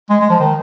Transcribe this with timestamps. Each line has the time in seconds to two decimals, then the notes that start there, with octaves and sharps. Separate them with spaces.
0.10 G#3
0.21 G#3
0.30 F3
0.40 D#3